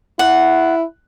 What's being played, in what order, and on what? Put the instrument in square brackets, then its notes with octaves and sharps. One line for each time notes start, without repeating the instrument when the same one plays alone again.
[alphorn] E4 [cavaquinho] F#5